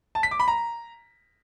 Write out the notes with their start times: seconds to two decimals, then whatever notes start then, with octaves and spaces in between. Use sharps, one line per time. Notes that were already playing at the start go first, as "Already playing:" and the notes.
0.15 A5
0.23 B6
0.31 D6
0.40 B5
0.48 A#5